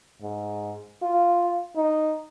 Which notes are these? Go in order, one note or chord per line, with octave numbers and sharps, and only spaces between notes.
G#2
F4
D#4